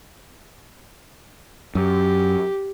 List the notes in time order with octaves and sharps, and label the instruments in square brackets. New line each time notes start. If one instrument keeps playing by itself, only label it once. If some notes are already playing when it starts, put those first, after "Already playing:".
[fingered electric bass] F#2 [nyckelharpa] G4